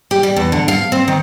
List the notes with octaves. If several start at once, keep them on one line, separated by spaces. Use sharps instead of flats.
G4
G3
E2
D3
F5
C4
D#3